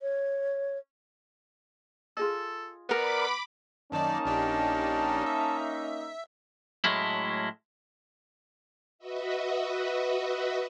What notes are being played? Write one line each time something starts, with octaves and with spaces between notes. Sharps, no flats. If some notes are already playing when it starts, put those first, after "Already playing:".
C#5
F4 G#4 A4 D#5
B3 A#4 D5 B5 D6
F#2 D#3 A#3 C#4 D#4 D5 A5
A#1 D4 G4
E5
A2 F#3 G#3 A3 C#4 E4
F#4 B4 D#5 E5